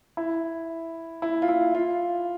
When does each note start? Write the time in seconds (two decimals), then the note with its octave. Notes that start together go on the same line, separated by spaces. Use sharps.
0.17 E4
1.22 E4
1.42 F4
1.49 E4
1.75 F4